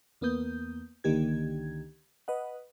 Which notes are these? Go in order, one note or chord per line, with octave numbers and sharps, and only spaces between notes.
E2 A#3 B3 D#6 G6
C#2 D3 D#3 A#3 G4 G#6
B4 D#5 F#5